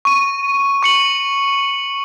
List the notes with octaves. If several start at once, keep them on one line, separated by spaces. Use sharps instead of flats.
C#6 D#7
C#6 C#7 F#7